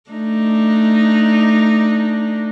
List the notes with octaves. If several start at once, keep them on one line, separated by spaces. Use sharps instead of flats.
A3 D4 D#4